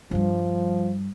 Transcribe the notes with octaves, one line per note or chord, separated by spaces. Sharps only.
G2 F3 G3